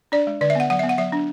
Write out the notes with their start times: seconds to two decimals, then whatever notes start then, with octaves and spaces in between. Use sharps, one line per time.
0.12 D4 D5
0.27 G#3
0.41 D3 D5
0.50 E5
0.55 B3 F#5
0.70 F#3 F#5
0.79 E5
0.83 B3
0.89 F#5
0.98 F#3 E5
1.12 D4